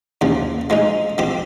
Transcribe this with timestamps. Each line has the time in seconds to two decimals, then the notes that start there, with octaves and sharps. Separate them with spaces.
0.21 D#2 C#3 F3
0.70 F3 G#3 D#4
1.18 F3 C4 G4